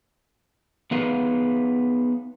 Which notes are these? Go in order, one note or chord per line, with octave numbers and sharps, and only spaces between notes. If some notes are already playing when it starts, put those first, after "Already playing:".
B3 D#4 G#4 B4 F5